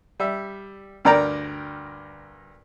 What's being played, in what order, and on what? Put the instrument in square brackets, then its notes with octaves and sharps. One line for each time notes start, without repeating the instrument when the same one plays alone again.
[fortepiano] G3 E5
D2 G2 A#4 D5 G5 A#5